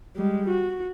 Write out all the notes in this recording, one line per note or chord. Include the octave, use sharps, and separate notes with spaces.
G3 G#3
F#4